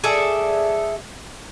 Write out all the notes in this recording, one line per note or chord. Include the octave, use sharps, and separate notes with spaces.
G#4 A4 D5 E5